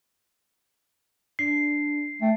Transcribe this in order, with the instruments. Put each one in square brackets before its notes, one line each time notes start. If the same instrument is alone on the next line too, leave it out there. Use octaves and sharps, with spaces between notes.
[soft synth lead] D4 [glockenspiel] C7
[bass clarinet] A3 [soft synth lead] G5